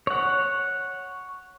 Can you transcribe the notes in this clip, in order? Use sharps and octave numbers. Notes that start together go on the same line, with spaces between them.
C#5 F#5